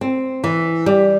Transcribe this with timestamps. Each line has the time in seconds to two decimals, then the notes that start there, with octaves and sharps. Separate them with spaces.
0.01 C4
0.44 E3
0.86 G3